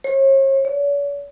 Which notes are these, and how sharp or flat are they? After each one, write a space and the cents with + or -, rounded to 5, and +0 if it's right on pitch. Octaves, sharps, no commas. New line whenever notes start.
C#5 -40
C#5 +45